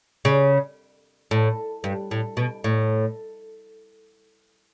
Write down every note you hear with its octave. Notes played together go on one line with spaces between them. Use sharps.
C#3
A2
G2
A2
B2
A2